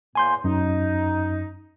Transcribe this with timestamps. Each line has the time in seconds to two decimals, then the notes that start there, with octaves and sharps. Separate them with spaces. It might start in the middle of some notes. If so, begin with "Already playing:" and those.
0.15 E2 A2 A#3 G#5 C6 G6
0.44 F#2 D#4